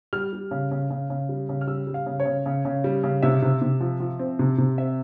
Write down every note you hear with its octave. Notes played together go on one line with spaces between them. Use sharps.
G3 F6
G3
C#3
C#3
C#3
C#3
G3
C#3
F6
G3 E6
G3
F5
C#3
C#5
C#3
C#3
C#3
G3
C#3
C3 E5
C3
C3
F3
F3
C4
C3
C3
C4 E5